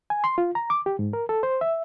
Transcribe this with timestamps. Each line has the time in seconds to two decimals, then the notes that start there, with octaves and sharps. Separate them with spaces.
0.10 G#5
0.24 C6
0.38 F4
0.55 A#5
0.70 D6
0.86 G4
0.99 G#2
1.13 A#4
1.29 A4
1.43 C5
1.61 E5